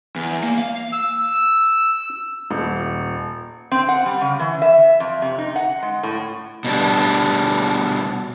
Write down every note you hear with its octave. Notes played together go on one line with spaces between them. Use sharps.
E2
A#3
F5
E6
D#1
C4
F#5
G3
C#3
E3
E5
F2
C3
D#4
F#5
G#3
A2
B2 G3 D4